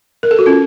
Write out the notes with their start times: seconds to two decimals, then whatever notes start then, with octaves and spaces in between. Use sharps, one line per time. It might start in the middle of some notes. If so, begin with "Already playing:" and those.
0.23 A#4
0.31 A4
0.39 F#4
0.46 C#4 F4